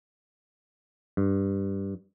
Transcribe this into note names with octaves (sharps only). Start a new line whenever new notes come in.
G2